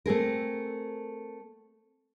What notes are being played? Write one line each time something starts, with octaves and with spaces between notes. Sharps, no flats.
A3 C4 G#4 A#4